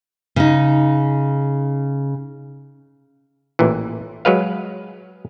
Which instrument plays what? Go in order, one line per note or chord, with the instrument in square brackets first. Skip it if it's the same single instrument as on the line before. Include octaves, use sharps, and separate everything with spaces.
[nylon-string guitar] C#3 D#4
[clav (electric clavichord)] A1 A#2 E3
F#3 G#3 B4 F5